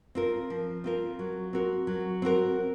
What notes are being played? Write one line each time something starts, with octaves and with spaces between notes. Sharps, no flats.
C4 F4 A#4
F3
C4 F4 A#4
F#3
C4 F#4 A#4
F#3
C4 F#4 A#4